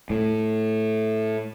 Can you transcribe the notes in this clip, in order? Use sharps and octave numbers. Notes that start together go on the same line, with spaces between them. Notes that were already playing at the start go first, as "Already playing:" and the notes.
A2